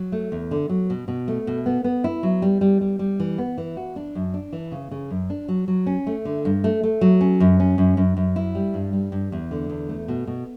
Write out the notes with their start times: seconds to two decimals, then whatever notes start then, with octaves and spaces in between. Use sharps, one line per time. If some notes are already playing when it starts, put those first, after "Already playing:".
Already playing: F#3
0.12 A3
0.32 E2
0.51 D3
0.69 F#3
0.90 B2
1.08 B2
1.28 A3
1.47 B2
1.66 B3
1.84 B3
2.04 E4
2.23 F#3
2.42 G3
2.61 G3
2.81 G3
2.99 G3
3.20 E3
3.38 B3
3.58 E3
3.77 F#4
3.96 D4
4.15 F#2
4.34 D4
4.53 E3
4.72 C#3
4.91 C#3
5.10 F#2
5.30 D4
5.48 F#3
5.68 F#3
5.86 C#4
6.07 A3
6.25 D3
6.45 G2
6.64 A3
6.83 A3
7.01 F#3
7.21 C#4
7.40 F#2
7.60 C#4
7.78 F#2
7.97 F#2
8.17 F#2
8.36 E4
8.55 G3
8.74 G2
8.93 G3
9.12 G2
9.32 E2
9.51 D3
9.70 E2
9.89 A3
10.08 B2
10.27 B2